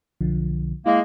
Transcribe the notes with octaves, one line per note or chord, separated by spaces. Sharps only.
B1 D3 F3
G#3 A#3 E4